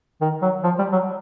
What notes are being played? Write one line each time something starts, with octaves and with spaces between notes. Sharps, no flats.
D#3
F#3
F3
G3
F#3